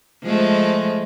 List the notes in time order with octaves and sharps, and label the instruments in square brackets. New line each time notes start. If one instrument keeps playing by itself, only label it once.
[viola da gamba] F3 G#3 A3